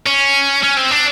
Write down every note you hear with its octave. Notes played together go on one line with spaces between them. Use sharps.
C#4
C#4
C4
D4